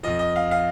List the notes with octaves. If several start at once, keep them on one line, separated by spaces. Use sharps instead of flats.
F2 F3 D#5
D#5
F5
F5